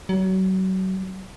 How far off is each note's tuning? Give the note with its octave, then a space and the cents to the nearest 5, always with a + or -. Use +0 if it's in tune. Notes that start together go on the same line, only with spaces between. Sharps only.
F#3 +30